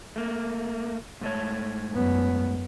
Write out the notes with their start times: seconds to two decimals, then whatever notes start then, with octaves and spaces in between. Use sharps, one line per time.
0.16 A3 A#3
1.21 G#2 A3 C#5
1.92 F#2 B3